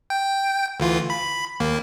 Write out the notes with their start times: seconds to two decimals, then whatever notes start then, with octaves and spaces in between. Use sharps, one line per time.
0.10 G5
0.80 D2 E3 F4
1.10 B5
1.60 D#2 A#3